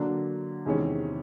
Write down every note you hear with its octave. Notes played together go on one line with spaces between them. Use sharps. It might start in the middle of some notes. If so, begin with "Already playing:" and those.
Already playing: D3 F#3 A#3 D4
E2 C3 D#3 G#3 C#4